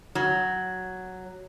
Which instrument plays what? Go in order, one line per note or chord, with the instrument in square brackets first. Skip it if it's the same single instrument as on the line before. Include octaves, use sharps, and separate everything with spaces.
[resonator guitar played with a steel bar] F#3